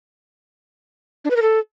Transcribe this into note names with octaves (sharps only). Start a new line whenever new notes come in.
D4
B4
A#4
A4